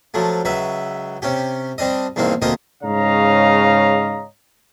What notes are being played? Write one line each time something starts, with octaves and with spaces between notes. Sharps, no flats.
F3 F#3 A3
C#2 F#3 B4 E5
C3 C#4 G4
G3 C4 D4 D#5
E2 G2 A#3 C4 D#4
D2 A#3 C4 F4 G4 D#5
G#2 C#3 C#5 D#5 F5 A#5